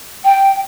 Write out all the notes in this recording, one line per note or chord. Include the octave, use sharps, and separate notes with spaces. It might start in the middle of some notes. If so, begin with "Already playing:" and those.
G5